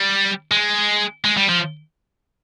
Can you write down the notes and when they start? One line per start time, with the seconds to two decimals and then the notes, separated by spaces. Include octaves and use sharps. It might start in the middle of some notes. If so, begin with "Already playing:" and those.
Already playing: G3
0.51 G#3
1.25 G#3
1.37 G3
1.49 F3